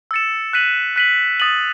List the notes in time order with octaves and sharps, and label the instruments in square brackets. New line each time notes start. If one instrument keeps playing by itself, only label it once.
[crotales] E6 A6 C#7 E7
F#6 B6 D#7 F#7
F#6 B6 D#7 F#7
D#6 A6 D#7 F#7